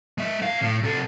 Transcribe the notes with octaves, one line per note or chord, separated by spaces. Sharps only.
G#3 E5
B3 F5
A2
C3 A4